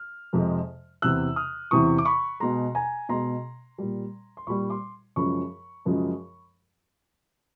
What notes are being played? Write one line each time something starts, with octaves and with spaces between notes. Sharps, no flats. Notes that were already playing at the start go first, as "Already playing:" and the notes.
Already playing: F6
F2 C3 F3 G#3
E2 C3 E3 E6 F#6
D#6 F6
E2 C3 E3 C#6 D#6
D6
B5 C#6
B2 G#3 A#5 C6
G#5 A#5
B2 G#3 A#5 C6
A#2 G3
C6
A#2 G3 B5 C#6
C6 D6
F#2 C#3 F3 G#3 B5 C#6
F#2 C#3 F3 G#3